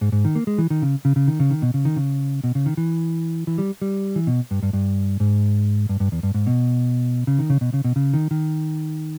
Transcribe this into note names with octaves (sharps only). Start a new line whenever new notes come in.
G#2
G#2
D#3
A#3
G#3
E3
D#3
C#3
C#3
C#3
D#3
C#3
D#3
B2
C#3
D#3
C#3
B2
C#3
D#3
E3
E3
G3
G3
E3
B2
G2
G2
G2
G#2
G2
G2
E2
G2
G#2
B2
C#3
D#3
C#3
B2
C#3
B2
C#3
D#3
D#3